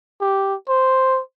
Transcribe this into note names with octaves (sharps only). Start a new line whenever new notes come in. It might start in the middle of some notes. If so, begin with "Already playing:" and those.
G4
C5